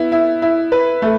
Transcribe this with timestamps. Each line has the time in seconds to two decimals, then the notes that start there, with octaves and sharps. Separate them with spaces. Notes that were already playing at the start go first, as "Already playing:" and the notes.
Already playing: B3 E4
0.12 E4
0.42 E4
0.72 B4
1.02 A3